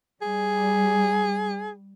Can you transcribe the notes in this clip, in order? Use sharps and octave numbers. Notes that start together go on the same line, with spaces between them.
G3 G#4